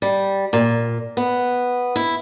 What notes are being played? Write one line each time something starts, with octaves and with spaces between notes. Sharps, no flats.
G3
A#2
B3
E4